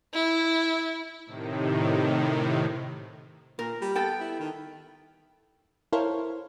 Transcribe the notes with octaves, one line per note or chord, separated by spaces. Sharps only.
E4
A2 C3 D#3
A#2 A#4
G3
B3 A4 G5
E4
D#3
E4 A4 A#4 C5 C#5 F5